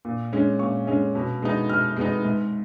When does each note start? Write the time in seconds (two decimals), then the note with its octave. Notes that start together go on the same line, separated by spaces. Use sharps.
0.05 A#2
0.33 G#3 C#4
0.59 A#2 C#6
0.87 G#3 C#4
1.15 B2
1.42 G#3 B3 D#4
1.69 B2 F6
1.96 G#3 B3 D#4
2.25 G#2